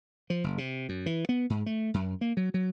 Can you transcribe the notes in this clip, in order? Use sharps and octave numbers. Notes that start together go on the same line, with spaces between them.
F3
F#1
C3
F#2
E3
B3
G#2
A3
F#2
A#3
F#3
F#3